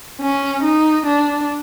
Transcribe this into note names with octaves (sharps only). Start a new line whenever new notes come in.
C#4
D#4
D4